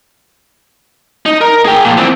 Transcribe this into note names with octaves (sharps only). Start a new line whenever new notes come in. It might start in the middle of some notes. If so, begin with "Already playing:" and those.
D#4
A#4
G#4 G5
A#2 F3
E3 C4